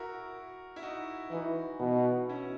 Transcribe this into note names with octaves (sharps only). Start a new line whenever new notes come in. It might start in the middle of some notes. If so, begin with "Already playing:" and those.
Already playing: E4 F#4 A#4
E4
D#4 F#4
E3 D#4 F#4
B2
C#4 E4